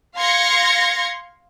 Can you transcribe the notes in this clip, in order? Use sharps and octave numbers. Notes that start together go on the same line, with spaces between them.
F5 C6 G#6 A#6 C#7